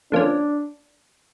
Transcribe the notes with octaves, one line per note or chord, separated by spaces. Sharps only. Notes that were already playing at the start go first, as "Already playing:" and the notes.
D3 F3 A#3 C#4 D4